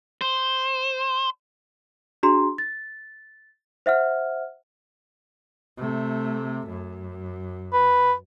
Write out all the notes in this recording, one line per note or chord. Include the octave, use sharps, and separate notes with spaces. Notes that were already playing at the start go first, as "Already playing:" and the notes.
C5
D4 F#4 G#4 A#5 C6
A6
C5 E5 F#5 F6
C3 A3
F#2
B4